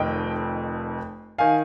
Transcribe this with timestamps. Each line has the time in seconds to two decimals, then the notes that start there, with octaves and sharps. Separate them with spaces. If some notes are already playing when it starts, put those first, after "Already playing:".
Already playing: F1 F2 D#3 D#5 G5
1.38 D#3 F5 G#5